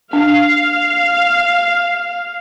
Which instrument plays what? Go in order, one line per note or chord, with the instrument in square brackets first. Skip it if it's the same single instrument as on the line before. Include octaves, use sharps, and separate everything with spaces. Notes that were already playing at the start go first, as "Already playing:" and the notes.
[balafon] D4 [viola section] F5